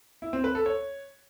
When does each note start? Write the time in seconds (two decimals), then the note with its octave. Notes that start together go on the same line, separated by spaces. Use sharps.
0.22 E4
0.33 C4
0.44 B4
0.55 A4
0.66 C#5